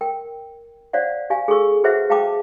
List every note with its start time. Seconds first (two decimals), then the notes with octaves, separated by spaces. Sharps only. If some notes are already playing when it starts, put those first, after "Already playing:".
0.01 A#4 G5
0.93 C5 D5 F5 F#5
1.30 G4 F5 G#5
1.48 G#4 A4 C#6 E6
1.84 F#4 G#4 B4 C5 E5 F#5
2.10 G#4 F5 G5 A5 B5 D6